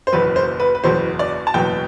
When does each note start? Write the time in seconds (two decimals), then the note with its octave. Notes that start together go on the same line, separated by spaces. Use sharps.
0.07 C5
0.12 F#1 E2 B2 F#3 B4
0.36 C5
0.60 B4
0.75 B4
0.84 F#1 E2 B2 F#3 C5
1.19 D5
1.47 A5
1.54 F#1 E2 B2 F#3 G5